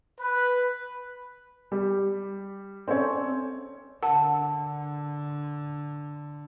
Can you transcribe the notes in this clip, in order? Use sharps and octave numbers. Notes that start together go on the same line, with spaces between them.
B4
G3 G4
C4 C#4 A4 C#5 D5
D3 A#4 F#5 A5